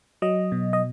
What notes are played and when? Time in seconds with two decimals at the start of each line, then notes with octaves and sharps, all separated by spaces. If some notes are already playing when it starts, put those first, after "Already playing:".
0.22 F#3 D#5
0.52 B2
0.73 D#5